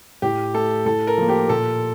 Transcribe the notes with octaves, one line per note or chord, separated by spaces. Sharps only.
A2 G4
A3 A4
A2 A4
A#4
F3 A#3
G4
A#2 A4